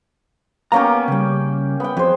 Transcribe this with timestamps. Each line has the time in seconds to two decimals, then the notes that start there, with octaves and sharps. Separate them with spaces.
0.72 A#3 B3 C#4 G4 A#5
1.08 C#3 G3
1.80 B3 G5
1.97 F2 G#4 C5